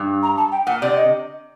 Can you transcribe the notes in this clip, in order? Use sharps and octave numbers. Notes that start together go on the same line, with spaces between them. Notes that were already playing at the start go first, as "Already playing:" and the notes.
Already playing: G2
A#5
A5
G5
A#2 F#5
C3 D5
D#5